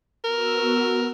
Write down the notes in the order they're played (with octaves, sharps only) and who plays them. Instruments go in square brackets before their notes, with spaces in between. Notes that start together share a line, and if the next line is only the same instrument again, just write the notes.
[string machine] B3 F#4 E6 [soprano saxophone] A#4